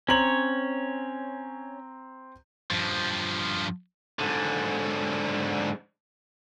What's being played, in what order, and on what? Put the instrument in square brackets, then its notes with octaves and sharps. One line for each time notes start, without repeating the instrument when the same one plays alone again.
[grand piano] C4 A#5 F#7 [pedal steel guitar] C#4 C#5
[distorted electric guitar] G2 F3
G#2 D3